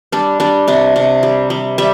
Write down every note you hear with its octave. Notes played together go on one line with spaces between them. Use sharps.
G3 D4
G3 D4
C3 D4
C3
G3
G3
G3 E5